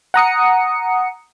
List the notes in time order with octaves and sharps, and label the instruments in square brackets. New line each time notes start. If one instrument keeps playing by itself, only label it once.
[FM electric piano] F#5 A#5 D#6 C#7